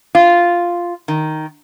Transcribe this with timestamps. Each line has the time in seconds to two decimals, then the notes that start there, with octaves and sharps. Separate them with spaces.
0.15 F4
1.08 D#3